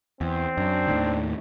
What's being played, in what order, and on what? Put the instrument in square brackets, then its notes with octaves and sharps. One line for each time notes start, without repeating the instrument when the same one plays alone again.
[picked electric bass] E2 [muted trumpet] C4
[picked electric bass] F#2 [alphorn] D4
[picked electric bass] D#2 A2 D#3